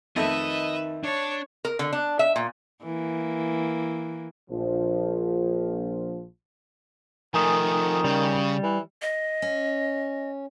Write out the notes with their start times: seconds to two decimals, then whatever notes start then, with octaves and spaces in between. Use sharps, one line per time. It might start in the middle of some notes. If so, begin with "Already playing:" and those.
0.16 F2 D#3 A3 B4 D#5 E5
1.04 D4 C#5 A5
1.65 A#4
1.79 D3
1.93 D4
2.19 E5
2.36 A#2
2.83 E3 A#3
4.50 A#1 F3
7.34 D#3 F3 A3 G#5 D#6
8.04 C#3 G3
8.63 E3
9.02 D#5
9.42 C#4